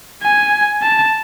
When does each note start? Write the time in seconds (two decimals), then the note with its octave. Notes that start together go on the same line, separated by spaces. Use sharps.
0.23 G#5
0.82 A5